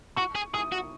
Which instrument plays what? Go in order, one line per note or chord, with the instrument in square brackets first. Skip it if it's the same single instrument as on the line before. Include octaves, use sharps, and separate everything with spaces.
[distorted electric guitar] F#4 [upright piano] C#6
[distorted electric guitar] G#4
[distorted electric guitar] G#4 [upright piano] D#6
[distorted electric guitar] F#4